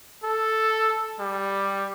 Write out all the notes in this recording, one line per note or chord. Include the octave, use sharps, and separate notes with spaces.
A4
G3